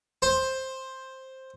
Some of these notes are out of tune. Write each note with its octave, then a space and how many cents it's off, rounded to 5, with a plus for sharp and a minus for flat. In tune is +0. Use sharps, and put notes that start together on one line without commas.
C5 +10